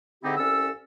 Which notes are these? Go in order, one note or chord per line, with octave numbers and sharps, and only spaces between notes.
G#2 D3 C4 D#4 E4 G4
C2 C#4 A4 E6